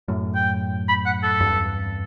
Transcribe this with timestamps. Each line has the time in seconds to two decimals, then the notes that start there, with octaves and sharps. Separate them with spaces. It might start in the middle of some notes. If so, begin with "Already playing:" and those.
0.08 F#2 A2
0.35 G5
0.88 B5
1.06 F#5
1.23 A4
1.40 E2 G2